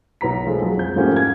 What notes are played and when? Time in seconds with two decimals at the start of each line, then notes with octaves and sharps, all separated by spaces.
0.21 B1 B4 A#5 B6
0.47 F3 G#3 A4
0.61 F#3 G#3
0.77 F2 G6
0.96 G#2 F3 A3 A#3 C#4 G4
1.16 G#6